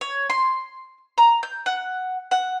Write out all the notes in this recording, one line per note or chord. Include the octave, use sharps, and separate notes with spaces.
C#5
C6
A#5
G6
F#5
F#5